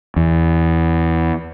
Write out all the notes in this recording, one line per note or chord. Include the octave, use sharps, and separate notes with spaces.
E2